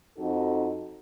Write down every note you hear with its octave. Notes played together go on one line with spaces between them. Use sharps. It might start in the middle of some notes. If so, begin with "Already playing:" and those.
F2 D#4 F#4 A4